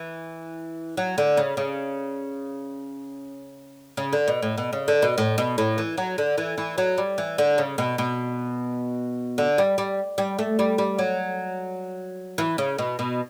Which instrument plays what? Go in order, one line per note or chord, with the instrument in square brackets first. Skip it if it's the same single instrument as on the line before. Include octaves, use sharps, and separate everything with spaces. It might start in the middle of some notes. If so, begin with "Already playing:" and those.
Already playing: [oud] E3
F#3
D3
C#3
C#3
C#3
D3
B2
A2
B2
C#3
D3
B2
A2
B2
A2
E3
F#3
D3
E3
E3
F#3
G3
E3
D3
C#3
B2
B2
D3
G3
G3
G3
A3
G3
G3
F#3
E3
C#3
B2
B2